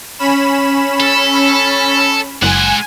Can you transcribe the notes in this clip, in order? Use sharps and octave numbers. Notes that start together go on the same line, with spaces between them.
C#4 B5 E7
A4
F#1 G#3 F#5 G#5